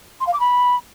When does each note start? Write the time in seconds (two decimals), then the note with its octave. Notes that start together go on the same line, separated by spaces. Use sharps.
0.20 C6
0.27 F5
0.33 D6
0.39 B5